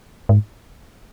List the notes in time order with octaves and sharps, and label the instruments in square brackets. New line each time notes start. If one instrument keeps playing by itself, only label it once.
[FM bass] G#2